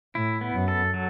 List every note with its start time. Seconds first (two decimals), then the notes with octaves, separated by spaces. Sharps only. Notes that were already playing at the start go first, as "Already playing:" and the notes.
0.15 A2 E4
0.41 B3
0.54 F#2
0.68 A4
0.94 F#3